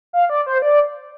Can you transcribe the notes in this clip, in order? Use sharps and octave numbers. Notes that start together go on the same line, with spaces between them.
F5
D5
C5
D5